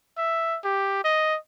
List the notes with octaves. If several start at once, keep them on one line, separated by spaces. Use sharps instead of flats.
E5
G4
D#5